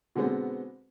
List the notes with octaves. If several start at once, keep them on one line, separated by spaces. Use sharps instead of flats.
B2 D3 G#3 B3 C4